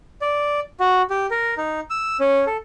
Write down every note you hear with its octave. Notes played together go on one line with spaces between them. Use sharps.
D5
F#4
G4
A#4
D#4
E6
C#4
A4